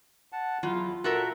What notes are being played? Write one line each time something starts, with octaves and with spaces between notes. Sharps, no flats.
F#5 A5
E2 F#3 E4 F4
A#2 F#4 A4 A#4 E5